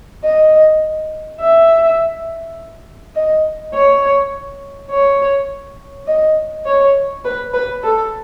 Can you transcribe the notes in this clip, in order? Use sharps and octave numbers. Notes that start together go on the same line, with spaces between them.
D#5
E5
D#5
C#5
C#5
D#5
C#5
B4
B4
A4